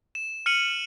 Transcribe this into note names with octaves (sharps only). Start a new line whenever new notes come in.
E7
F6 C#7 D#7 F#7